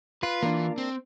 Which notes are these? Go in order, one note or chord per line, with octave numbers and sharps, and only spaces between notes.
F4 B4
E3 A#3 D4
C4